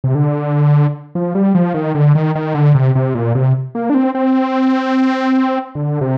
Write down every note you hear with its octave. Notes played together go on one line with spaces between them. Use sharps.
C3
D3
F3
G3
F3
D#3
D3
D#3
D#3
D3
C3
C3
A#2
C3
A#3
D4
C4
C4
D3
C3